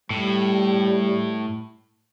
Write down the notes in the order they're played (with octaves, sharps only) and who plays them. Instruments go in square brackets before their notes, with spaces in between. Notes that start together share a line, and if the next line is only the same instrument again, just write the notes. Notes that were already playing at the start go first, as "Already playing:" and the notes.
[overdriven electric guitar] A2 [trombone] G3